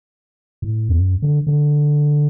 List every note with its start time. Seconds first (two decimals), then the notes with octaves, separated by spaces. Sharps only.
0.62 A2
0.89 E2
0.98 F#2
1.22 D3
1.47 D3